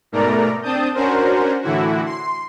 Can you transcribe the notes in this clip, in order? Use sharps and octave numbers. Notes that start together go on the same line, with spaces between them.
G#2 B2 A3 A#4 D5 A#5
C4 D4 A5 D#6 G6
C#4 D4 F#4 A#4 C5
A2 D3 E3 E4 F#4
C6